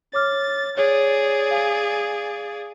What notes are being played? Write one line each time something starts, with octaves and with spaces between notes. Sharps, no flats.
C#5 D6 F6 A6
G#4 C#5 D5
F5 G#5